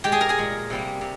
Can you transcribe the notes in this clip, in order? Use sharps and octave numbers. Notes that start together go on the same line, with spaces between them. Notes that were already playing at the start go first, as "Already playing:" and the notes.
A#2 G#3 G4 G5
G#4 G#5
A#4 A#5
G#4 G#5
A#2 G#3
C3 G3 A#3
C3